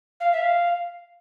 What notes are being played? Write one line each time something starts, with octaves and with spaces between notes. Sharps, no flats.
F5
E5
F5